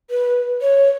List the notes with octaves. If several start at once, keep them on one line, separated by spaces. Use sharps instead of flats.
B4
C#5